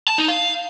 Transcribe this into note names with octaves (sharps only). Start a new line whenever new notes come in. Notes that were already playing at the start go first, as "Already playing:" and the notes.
A5
D#4
F5